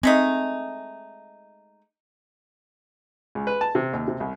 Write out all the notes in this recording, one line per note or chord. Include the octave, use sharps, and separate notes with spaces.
G#3 A3 C4 D#4
C#2
B4
A5
C3
D#2
C3
C2